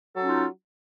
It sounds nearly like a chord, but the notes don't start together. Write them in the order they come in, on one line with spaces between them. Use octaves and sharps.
F#3 A4 C#4 D#4 F4